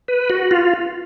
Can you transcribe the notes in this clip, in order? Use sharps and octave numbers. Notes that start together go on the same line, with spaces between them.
B4
F#4
F4